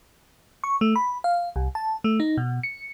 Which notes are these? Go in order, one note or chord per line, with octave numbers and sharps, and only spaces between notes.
C#6
A3
B5
F5
C2
A5
A3
D#4
B2
C#7